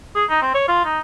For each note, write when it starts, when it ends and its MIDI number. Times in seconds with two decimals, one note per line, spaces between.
0.15 0.25 68
0.30 0.38 63
0.42 0.52 60
0.54 0.67 73
0.69 0.83 65
0.86 0.99 63